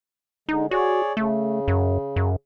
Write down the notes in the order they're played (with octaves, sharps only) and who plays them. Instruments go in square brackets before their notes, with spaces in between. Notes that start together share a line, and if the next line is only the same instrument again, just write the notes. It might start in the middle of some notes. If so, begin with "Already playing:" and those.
[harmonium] D3 G#3 [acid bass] D#4
[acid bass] F#4 [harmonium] G#4 C#5 D5
[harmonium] C#3 [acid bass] A3
[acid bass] F#2
F#2